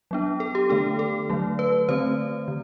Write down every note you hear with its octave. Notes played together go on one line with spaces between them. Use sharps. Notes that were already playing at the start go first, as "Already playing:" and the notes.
F#3 B3 D4
A4
G4
D3 A3 D4 A4
A4
D3 F#3 A3
B4
D3 A3 C4 C5
D3